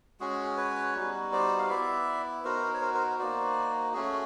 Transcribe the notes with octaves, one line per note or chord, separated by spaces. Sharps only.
G#3 C#4 F#4 G#4
B4 C#5
G3 B3 D#4 F#4
C5 D5
F5
B3 E4 D5 E5
B3 D#4 F#4 A#4 C5
C#5
A#4 C5
A#4 C5
A#3 D#4 F#4 C5 D5
A3 C#4 F#4 G#4